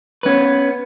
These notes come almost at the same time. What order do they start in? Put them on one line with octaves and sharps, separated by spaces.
B4 C#4 B3